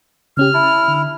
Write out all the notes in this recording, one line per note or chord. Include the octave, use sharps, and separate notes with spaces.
C#3 C#4 G4 F6
E4 A5
D3